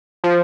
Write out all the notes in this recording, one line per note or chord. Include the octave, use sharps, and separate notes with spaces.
F3